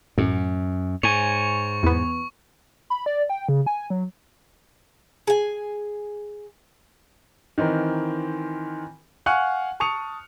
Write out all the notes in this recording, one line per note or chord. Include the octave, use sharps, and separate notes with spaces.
A1 F#2
G#2 C#5 G#5 C#6
E2 B3
B5
D5
G5
C#3
G#5
F#3
G#4 G#5
D#3 E3 C4 A#4
F5 F#5 G#5 C#6 F6 F#6
A5 C#6 D#6 C#7 F7